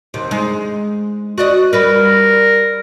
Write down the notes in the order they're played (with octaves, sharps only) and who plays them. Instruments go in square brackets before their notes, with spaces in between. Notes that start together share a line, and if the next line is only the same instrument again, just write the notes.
[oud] D#2 C3
G#3 D#4
F#4 D5 D#5
[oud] G3 B4 [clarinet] A#4